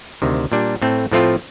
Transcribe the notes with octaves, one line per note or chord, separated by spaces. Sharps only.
D2 C3 D#3
A#2 G3 D4
A2 A3 C4
A2 F3 A3 C4 F4